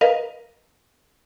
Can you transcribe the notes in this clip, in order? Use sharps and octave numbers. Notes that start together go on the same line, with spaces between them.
A#4 B4 D#5 F5